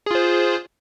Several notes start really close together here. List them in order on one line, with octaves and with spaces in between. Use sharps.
G#4 F4 C5